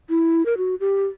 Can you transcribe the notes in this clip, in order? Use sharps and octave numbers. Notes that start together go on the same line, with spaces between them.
E4
A#4
F#4
G4